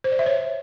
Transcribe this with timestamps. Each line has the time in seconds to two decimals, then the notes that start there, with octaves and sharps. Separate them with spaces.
0.04 C5
0.12 D5
0.19 E5
0.26 C#5